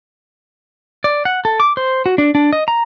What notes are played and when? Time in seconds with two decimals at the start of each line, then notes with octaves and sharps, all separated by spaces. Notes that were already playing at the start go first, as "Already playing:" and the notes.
1.04 D5
1.25 F#5
1.45 A4
1.60 D6
1.77 C5
2.06 F#4
2.18 D4
2.35 D4
2.53 D#5
2.68 A#5